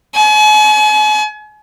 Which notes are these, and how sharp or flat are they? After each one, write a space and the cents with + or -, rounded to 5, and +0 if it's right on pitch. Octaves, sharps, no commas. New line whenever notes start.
G#5 +40